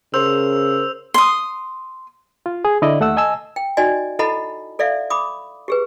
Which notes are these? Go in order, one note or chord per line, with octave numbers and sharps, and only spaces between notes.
C#3 A#4 C5 E6 F7
C6 D#6
F4
G#4
D3 E4 D5 D#5
D#2 A3 F#5 E6
D#5 G#5 A5 E6
G5
D#4 F#4 D5 D#5 G#5
E4 A4 D#5 F#5 A5 B5
A4 D5 E5 F5
B5 D6 D#6
G4 G#4 B4